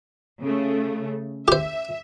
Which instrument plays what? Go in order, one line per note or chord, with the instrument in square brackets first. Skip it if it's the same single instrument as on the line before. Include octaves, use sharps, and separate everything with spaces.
[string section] C#3 A3
[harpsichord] G4 C5 [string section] E5